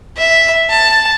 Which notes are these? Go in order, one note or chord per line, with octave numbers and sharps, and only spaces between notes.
E5
A5